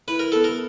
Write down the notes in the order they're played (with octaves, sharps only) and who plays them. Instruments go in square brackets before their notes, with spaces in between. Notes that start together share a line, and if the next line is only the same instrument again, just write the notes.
[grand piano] E4 [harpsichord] B4
[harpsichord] A#4
[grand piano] B3 [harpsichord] A4
[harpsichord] A#4